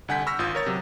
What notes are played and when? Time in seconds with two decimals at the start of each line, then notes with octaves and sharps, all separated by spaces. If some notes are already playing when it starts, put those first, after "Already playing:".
0.08 C2 D3 F#5 G#5 G6 B6
0.26 B5 C#6 E6 F6 A#6 B6
0.39 G#1 F4 D#6 G6
0.55 A#4 C#5 A6
0.66 C3 F#3